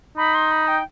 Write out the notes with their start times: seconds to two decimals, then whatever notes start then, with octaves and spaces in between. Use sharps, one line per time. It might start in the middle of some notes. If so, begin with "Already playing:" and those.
0.17 D#4 B5
0.35 C6
0.51 B5
0.68 G5